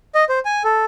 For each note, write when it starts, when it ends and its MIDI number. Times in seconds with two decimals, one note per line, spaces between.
0.15 0.24 75
0.29 0.39 72
0.45 0.63 80
0.64 0.85 69